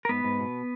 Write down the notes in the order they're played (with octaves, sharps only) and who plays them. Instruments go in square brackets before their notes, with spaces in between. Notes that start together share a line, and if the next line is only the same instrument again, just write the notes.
[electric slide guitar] A#4
G#2 B3 B4
G#2
B2